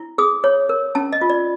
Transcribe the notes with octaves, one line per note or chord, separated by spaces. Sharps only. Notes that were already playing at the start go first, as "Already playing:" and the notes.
Already playing: E4
G#4 D#6
C#5
A#4
C#4 A5
D#5
F4
D5